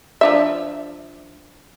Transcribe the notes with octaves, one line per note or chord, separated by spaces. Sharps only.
F3 D4 E5